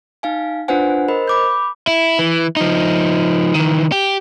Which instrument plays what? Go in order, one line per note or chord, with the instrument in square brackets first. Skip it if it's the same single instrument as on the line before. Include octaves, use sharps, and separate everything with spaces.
[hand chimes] D#4 F5 G#5
D4 F4 B4 C5 F#5 G#5
A#4 C5 D#5 B5
B5 D6 G6
[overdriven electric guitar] E4
E3
F3 D#4
D#3 E3
G4